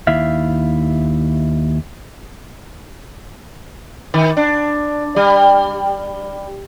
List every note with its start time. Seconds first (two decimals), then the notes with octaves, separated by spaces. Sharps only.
0.07 D#2 E4 E5 F5
4.14 D#3
4.37 D4
5.16 G3